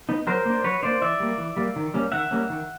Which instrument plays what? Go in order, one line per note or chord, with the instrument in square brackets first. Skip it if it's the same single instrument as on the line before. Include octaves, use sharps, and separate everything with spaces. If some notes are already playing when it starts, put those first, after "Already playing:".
[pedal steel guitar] B3 D#4
F#3 A#4 C5
A#3 D4
F#3 B4 C#5
A#3 D4 C5 D5
E3 D5 E5
G3 A#3
E3
G3 A#3
D#3
G3 A#3 C#4
D#3 E5 F#5
G3 A#3 C#4
D#3